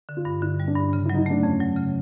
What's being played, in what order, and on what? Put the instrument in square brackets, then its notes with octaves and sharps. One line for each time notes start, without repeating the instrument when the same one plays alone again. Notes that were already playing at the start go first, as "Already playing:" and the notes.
[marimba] D3
[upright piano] F4
[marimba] G2
[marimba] D3 [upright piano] E4
[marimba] G3
[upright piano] D4
[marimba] G2
C#3
[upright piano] E4
[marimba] F#3 [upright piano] D#4
[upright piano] E4
[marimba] A3 [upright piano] D4
[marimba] F2 [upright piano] C#4
[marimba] F#3
C#3